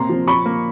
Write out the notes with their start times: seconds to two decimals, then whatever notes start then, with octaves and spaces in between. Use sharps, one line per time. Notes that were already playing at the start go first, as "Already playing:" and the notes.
Already playing: C3 A#3 A#5 C6
0.09 F3
0.27 F3 B5 C#6
0.46 A#3